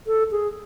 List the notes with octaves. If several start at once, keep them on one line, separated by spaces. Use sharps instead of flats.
A4
G#4